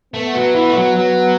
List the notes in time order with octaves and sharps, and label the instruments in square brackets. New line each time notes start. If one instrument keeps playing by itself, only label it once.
[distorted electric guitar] A3 [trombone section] B3
[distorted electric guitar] F#3
E3
A3
F#3
F#3